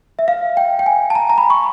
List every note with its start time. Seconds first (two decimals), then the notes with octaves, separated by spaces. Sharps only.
0.19 E5
0.28 F5
0.57 G5
0.79 G5
0.86 G#5
1.10 A5
1.15 A#5
1.30 A#5
1.38 B5
1.50 C#6